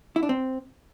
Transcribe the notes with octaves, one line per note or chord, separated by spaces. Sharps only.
E4
D4
C4